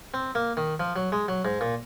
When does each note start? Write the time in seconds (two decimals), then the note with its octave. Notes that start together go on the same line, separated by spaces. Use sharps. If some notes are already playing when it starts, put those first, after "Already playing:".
0.14 C4
0.35 A#3
0.57 D#3
0.80 F3
0.96 F#3
1.12 G#3
1.28 F#3
1.45 G#2
1.61 A#2